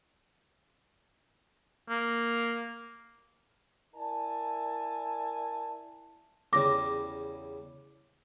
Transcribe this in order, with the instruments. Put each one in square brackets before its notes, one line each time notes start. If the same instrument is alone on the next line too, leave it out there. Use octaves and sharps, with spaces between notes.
[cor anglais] A#3
[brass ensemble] E4 A#4 D5 G#5 A5
[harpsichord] E2 C#3 G3 [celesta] D6 A#6